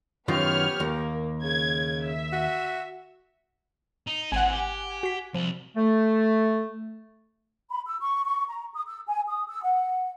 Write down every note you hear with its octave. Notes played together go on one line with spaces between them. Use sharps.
F#2 D#3 B3 F4 G4 C#5 F6
D#2 A#3
C#3 G#6
E5
F#4
D#4
G#1 E3 C4 F#5 G#5
G4
F#4 B6
C2 F3
A3
B5
E6
C#6
C#6
A#5
D#6
E6
G#5
D#6
E6
F#5